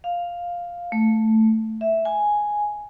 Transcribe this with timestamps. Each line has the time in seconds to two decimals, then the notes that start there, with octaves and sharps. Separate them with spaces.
0.04 F5
0.92 A3
1.81 E5
2.05 G#5